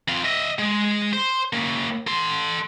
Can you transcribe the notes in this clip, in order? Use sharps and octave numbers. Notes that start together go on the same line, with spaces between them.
F2 F4
D#5 E5
G#3
C5
A#3 C#4
A4 C6